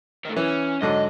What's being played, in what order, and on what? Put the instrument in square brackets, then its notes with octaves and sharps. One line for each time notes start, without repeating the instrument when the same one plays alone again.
[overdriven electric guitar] D#3 A3
[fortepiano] E3 [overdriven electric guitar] C#4
[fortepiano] G#2 D3 F#3 [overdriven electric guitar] D#5